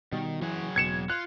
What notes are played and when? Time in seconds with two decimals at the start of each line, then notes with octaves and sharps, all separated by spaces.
0.13 B2 D#3 G3
0.42 E3 F#3 F#4 G#4
0.76 E1 B2 G#6 C#7 E7
1.10 F4 F#6